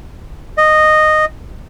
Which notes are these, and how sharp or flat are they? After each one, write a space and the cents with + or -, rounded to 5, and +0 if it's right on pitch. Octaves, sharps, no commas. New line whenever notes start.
D#5 -10